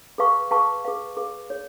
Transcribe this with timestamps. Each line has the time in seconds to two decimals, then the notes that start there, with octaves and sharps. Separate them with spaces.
0.18 G#4 B4 F5 A5 C#6
0.51 G#4 B4 F5 A5 C#6
0.85 G#4 B4 F5
1.17 G#4 B4 F5
1.50 G#4 C#5